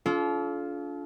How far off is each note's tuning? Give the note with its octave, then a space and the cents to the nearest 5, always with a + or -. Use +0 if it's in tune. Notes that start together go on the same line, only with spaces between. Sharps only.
D4 -40 F4 +0 A4 -35